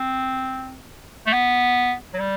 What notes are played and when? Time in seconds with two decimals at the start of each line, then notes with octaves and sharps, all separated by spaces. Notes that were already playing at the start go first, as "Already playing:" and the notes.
Already playing: C4
1.27 A3
1.33 B3
2.14 F#3
2.19 G3